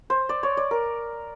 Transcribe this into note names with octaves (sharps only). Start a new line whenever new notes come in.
C5
D5
C#5
D5
A#4